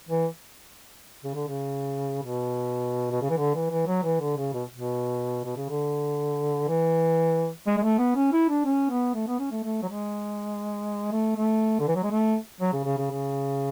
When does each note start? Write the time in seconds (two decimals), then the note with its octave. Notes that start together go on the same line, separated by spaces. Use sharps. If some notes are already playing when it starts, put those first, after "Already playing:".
0.09 E3
1.24 C#3
1.35 D3
1.48 C#3
2.23 B2
3.11 B2
3.22 C#3
3.30 E3
3.38 D3
3.55 E3
3.71 E3
3.87 F#3
4.03 E3
4.21 D3
4.37 C#3
4.54 B2
4.74 B2
5.44 B2
5.57 C#3
5.69 D3
6.68 E3
7.67 G#3
7.78 G#3
7.83 A3
7.99 B3
8.16 C#4
8.33 E4
8.49 D4
8.65 C#4
8.90 B3
9.14 A3
9.28 B3
9.40 C#4
9.51 A3
9.64 A3
9.83 F#3
9.89 G#3
11.12 A3
11.37 A3
11.79 D3
11.88 E3
11.96 F#3
12.04 G#3
12.11 A3
12.61 F#3
12.73 C#3
12.85 C#3
12.98 C#3
13.11 C#3